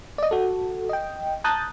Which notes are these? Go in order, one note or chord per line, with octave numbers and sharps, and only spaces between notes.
D5 D#5
F#4 A4
D#5 G5
A5 A#5 D#6 F#6 G6 A6